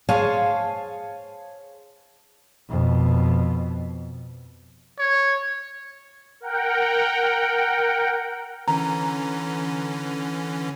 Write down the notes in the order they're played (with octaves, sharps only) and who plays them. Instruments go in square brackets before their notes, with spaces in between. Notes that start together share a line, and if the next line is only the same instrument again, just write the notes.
[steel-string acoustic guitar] G#4 C5 C#5 F5 G#5 A5
[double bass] F2 B2
[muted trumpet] C#5
[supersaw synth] A#4 F#5 G5
[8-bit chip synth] D3 E3 C#4 [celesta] A#5